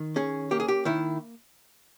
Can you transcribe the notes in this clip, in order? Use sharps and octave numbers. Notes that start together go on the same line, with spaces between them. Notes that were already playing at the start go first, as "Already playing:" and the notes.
Already playing: D#3
C#4 G#4
A#3 G4
G#4
G4
D#3 E4